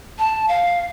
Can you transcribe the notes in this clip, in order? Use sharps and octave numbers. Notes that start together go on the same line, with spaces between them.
A5
F5